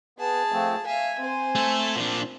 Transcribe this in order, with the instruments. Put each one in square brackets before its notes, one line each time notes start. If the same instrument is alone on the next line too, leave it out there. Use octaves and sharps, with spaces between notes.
[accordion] B3 [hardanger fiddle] G#4 A5
[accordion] F3 A3 C4
[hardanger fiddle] E5 F5 [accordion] G#5
[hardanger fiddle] C4 C5
[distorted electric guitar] A3 A4
A#2 D4